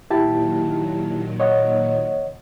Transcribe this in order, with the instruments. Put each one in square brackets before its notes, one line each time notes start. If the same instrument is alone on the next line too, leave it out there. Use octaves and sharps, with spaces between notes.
[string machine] A#2 D#3 F#3 [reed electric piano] E4 G4 A5
[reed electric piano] C#5 D#5 F#5